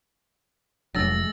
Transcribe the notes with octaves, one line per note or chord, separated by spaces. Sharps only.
F1 F#3 G#3 A3 D4 E6 A6 A#6